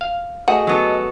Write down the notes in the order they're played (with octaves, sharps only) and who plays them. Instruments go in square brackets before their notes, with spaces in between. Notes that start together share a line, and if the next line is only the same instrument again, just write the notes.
[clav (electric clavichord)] F5
[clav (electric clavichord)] A3 F#4 G#4 [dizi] D#5 [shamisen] F#5
[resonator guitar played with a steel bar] F#3 B3 A4